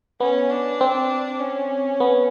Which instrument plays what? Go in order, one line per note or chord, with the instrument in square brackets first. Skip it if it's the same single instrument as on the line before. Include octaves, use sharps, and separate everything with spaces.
[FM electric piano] B3 [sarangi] C#4
[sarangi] D4
[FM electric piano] C4
[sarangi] C#4
[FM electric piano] B3